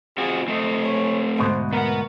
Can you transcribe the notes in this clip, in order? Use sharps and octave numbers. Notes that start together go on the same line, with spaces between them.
C4 F4 F#4 G#4
A3 C4 D#5
C#5
D2 G#2 B2 C5
B3 A#4 B4 F#5